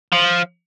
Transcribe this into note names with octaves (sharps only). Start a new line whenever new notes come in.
F3